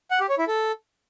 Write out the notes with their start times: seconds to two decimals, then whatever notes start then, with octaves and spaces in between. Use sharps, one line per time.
0.11 F#5
0.20 G4
0.29 C#5
0.39 E4
0.48 A4